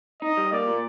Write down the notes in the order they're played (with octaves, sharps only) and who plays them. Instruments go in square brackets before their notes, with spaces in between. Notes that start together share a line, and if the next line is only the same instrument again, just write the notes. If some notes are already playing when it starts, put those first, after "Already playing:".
[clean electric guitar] D#4 [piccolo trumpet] D#5
[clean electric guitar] G3
[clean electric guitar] A#3 [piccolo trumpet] D5
[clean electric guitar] A#2